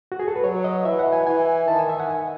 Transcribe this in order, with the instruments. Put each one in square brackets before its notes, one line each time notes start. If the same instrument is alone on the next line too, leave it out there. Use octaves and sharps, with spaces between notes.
[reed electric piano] F#4
G#4
A4
B4
[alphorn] F#3 [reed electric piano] C#5
[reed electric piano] D#5
[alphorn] E3 [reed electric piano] E5
[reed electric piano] F#5
G#5
[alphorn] E3 [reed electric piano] G#5
[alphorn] D#3 [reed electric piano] A5
[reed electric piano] G#5
E5
F#5
G#5